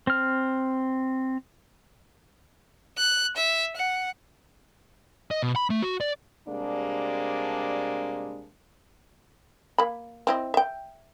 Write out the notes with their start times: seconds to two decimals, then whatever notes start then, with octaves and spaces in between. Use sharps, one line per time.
0.07 C4 F6
2.98 F#6
3.37 E5
3.76 F#5
5.31 D#5
5.43 B2
5.56 B5
5.70 A3
5.82 F#4
6.01 D5
6.47 C3 G3 G#3 A#3 D4
9.78 A#3 B5
10.27 C4 E4 D#5
10.54 E5 G5